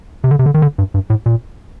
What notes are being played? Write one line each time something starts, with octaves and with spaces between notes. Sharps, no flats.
C3
D3
C3
D3
D#3
D3
G2
G2
A2
A#2